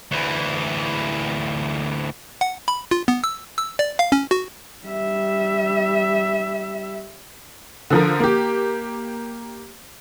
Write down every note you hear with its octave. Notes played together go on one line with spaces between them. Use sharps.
D2 E3
F#5
B5
F4
B3
E6
E6
D5
F5
C#4
F#4
G3 E5
D3 F3 A#4
A#3 G4